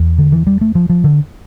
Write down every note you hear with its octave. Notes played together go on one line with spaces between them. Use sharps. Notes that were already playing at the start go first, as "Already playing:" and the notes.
Already playing: E2
D3
E3
G3
A3
F3
F3
D3